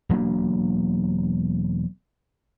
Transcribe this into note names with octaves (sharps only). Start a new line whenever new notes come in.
E1 F#3 A#3 D4